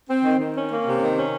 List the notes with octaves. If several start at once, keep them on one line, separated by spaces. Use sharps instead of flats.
C4
D#3
D#3
C#4
A#3
C3
D#3
C#4